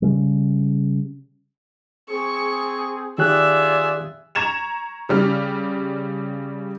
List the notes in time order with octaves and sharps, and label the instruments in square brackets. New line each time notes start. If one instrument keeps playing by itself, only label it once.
[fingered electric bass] C#3 G3
[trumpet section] C4 G#4 [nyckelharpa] C#6
[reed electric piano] D#3 G4 F#6 [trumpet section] F4 G#4 D5 [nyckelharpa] E5
[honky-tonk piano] A#5 C#6 G#6 E7 F7
C#3 G3 F6